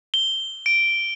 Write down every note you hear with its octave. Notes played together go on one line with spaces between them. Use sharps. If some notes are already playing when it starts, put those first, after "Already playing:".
G7
D7